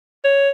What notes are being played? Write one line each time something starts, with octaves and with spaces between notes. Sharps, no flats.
C#5